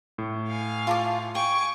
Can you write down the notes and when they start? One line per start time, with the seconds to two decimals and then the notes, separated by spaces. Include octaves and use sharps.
0.18 A2
0.48 F5 G#5
0.87 F4 A5 D6
1.35 G5 G#5 C#6 D6